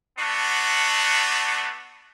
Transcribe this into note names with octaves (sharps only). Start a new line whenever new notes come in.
A3 B3 D4 F#4